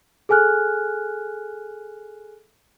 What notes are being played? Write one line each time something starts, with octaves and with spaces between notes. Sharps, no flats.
G#4 A4 G#5 F6 F#6